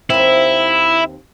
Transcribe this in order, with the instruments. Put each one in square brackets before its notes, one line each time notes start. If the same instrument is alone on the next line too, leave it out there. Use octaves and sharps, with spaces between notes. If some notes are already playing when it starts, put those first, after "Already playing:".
[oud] D#2 C4 [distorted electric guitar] E4